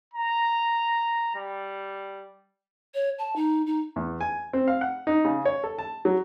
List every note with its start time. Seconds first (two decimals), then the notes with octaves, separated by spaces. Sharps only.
0.14 A#5
1.36 G3
2.94 C#5
3.19 A5
3.36 D#4
3.66 D#4
3.96 E2
4.21 G#5
4.53 C4
4.68 F5
4.81 F#5
5.07 D#4
5.25 C#3
5.45 C#5
5.64 A4
5.79 A5
6.05 F#3